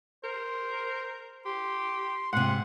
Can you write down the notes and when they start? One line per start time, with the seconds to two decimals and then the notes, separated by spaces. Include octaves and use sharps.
0.24 A#4 C5
1.45 G4 C6
2.33 G#2 C3 F#5 C6